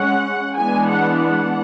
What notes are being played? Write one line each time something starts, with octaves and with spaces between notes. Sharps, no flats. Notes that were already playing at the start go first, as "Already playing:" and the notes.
Already playing: G#3 C#4 F#5
E3 G#3 B3 D4 G#5
F#5
F#5